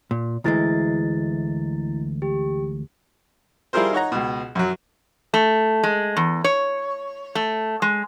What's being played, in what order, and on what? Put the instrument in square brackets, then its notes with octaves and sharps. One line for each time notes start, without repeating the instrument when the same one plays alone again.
[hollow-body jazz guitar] A#2
[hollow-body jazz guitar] D2 E3 G#3 [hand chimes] A3 E4 A6
[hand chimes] G4
[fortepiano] G3 E4 F4 G#4 A#4 C5
D#4 C#5 F#5 A#5
C#2 B2
F#2 F#3
[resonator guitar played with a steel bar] A3
G#3
E2
C#5
A3
G#3